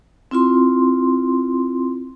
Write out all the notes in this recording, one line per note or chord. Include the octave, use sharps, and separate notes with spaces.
C4 E4 F4 C6